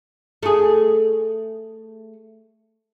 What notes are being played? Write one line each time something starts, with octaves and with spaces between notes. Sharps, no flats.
A3 G#4